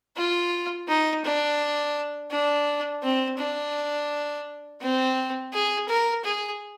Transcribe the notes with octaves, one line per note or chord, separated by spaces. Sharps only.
F4
D#4
D4
D4
C4
D4
C4
G#4
A#4
G#4